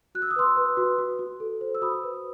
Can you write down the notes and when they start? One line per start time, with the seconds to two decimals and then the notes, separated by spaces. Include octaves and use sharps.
0.15 F#4 F#6
0.22 E6
0.31 D#6
0.36 B4 C6 E6
0.57 B4
0.77 F#4
0.99 F#4
1.19 F#4
1.40 A4
1.61 C5
1.75 E6
1.82 F#4 B5 D#6
2.04 B4